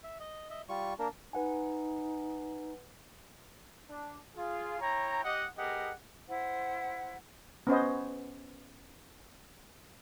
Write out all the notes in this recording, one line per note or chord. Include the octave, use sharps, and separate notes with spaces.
E5
D#5
D#5 E5
G3 F4 C#6
A#3 D4 A#4
D#4 B4 F#5 G#5
D4
F4 G#4
E4 C#5 G5 A#5
G4 D#5 F#5
B3 G4 G#4 A#4 D#5 F#5
E4 C5 F#5
B3 C#4 C5 D#5